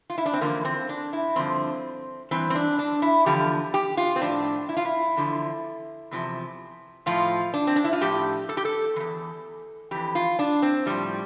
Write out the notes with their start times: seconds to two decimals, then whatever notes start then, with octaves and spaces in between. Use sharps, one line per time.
0.10 F4
0.18 E4
0.26 D4
0.33 C4
0.41 E2 D3 F3 A#3
0.65 C4
0.89 D4
1.13 E4
1.36 G2 D3 F3 C4
2.31 G2 E3 C4
2.50 C4
2.55 D4
2.79 D4
3.02 E4
3.26 E2 D3 F3 G4
3.74 G4
3.97 F4
4.16 C4
4.21 A2 F3 D4
4.69 E4
4.77 F4
4.85 E4
5.16 E2 D3 F3
6.11 E2 C3 F3
7.06 A2 F3 F4
7.54 D4
7.67 C4
7.76 D4
7.84 E4
7.93 F4
8.01 A2 F3 G4
8.49 A4
8.57 G4
8.65 A4
8.96 E3
9.00 E2
9.91 F2 E3 G4
10.15 F4
10.39 D4
10.62 C4
10.86 A2 F3 G3